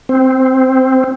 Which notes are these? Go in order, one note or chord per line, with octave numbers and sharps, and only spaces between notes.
C4